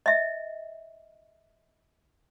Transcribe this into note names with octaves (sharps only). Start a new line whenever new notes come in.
D#5 E5